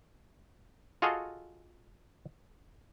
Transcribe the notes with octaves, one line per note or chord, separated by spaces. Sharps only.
F4 F#4 G#4 A4 D#5 F5